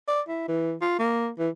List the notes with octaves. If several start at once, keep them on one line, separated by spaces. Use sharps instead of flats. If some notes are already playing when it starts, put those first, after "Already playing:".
D5
E4
E3
F4
A#3
E3